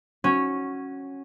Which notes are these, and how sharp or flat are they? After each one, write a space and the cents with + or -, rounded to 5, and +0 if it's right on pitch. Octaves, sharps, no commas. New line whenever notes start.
C#4 -10 F#4 +0